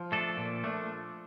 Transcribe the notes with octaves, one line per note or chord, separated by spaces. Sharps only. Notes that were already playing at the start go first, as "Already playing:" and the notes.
Already playing: F3
A3 D4 A4
A#2
A3 D4